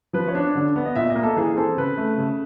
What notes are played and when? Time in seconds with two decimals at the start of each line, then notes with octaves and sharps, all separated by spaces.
0.13 F3 B4
0.27 C#5
0.35 D4
0.55 D3
0.76 B3
0.85 D#5
0.95 A#2 E5
1.10 D#5
1.16 A#3
1.23 A4
1.36 E3 G#4
1.56 C4 A4
1.77 C#3 B4
1.97 A3
2.18 C#3